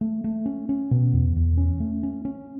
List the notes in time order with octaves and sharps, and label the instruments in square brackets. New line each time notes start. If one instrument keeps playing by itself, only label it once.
[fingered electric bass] A3
A3
C#4
C#4
B2
E2
E2
C#4
A3
C#4
C#4